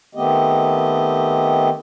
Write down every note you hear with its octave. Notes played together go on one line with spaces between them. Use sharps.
D#3 A3 B3 C4 G4 D#5